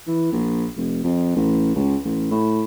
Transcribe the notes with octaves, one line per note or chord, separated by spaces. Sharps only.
E3
A#1
F1
F2
A1
C#2
A1
A2